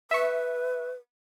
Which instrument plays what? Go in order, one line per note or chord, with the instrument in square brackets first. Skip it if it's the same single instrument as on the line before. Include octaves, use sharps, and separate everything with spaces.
[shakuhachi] B4 [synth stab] E5 C#6